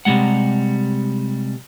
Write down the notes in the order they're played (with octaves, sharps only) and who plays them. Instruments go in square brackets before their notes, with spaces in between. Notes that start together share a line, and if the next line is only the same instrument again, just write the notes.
[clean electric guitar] C3 F3 G3 G#3 F#5